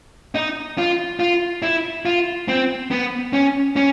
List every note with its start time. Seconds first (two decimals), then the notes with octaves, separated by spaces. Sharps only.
0.35 D#4
0.78 F4
1.20 F4
1.63 E4
2.05 F4
2.48 C4
2.91 B3
3.33 C#4
3.76 C#4